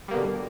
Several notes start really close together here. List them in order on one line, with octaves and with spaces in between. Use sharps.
G3 A#3 B2 D3